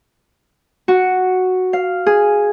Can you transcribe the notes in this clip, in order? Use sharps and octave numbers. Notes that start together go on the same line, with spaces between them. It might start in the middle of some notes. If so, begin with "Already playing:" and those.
F#4
F5
G#4